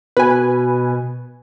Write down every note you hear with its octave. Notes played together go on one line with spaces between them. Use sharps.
B2 B4 G#5